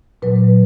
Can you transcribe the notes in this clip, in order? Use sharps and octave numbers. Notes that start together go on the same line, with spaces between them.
A#2 F#3 B4